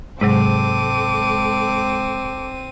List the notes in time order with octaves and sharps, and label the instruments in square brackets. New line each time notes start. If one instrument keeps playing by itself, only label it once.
[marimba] G#2 C3 F#3 [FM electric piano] G#3 [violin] C4 D#7 [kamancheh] A4 D6